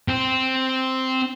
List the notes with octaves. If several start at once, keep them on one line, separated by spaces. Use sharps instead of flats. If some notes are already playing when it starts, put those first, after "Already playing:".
C4